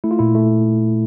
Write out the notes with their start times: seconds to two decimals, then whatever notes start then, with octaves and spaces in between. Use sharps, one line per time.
0.04 A3 E4
0.11 F4
0.19 A#2 E4
0.35 A3